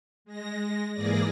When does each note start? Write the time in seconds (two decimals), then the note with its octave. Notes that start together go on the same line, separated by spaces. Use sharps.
0.25 G#3 A#6
0.92 G#2 E3 A#3 G#4 D5 A#6